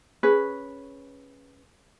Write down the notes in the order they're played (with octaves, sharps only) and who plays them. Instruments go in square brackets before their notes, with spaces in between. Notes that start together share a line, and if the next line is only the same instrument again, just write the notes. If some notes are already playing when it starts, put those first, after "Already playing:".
[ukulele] C#4 G#4 B4